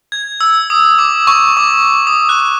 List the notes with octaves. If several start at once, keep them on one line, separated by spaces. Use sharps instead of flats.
G#6
E6
D#6
D6
C#6
D6
D6
D#6
F#6